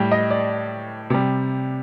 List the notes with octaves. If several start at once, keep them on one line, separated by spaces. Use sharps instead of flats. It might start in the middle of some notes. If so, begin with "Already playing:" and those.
Already playing: A2 G3 G5
D#5
D5
C3 G3